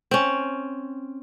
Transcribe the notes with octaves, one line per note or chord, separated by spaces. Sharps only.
C4 C#4